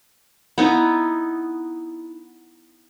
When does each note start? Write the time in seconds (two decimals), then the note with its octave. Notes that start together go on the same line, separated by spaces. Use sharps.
0.58 B3 D#4 E4